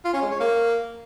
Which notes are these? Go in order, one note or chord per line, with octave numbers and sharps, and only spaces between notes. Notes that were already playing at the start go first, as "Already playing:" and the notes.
F4
C#4
G#3
C#5
A#3